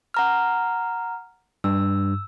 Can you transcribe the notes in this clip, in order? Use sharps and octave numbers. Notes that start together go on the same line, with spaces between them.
F#5 A#5 F6
G2 E6